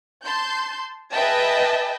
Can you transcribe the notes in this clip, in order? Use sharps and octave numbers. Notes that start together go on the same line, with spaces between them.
A5 C6 G6
G#4 B4 D#5 E5 G5 A5